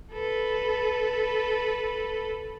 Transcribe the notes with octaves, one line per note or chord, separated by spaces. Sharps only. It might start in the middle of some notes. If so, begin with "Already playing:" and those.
A4 B4